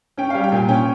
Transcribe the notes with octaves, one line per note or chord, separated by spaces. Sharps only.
C#4 G5
G3 F5
G5
A#2 G#5
C#4 G5